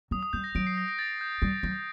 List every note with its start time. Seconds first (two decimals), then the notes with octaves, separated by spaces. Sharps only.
0.11 F#3 D#6
0.23 D#6
0.33 G3 G6
0.44 A#6
0.55 F#3 D7
0.67 C7
0.77 A#6
0.88 A#6
0.99 A6
1.21 G6
1.42 G3
1.63 F#3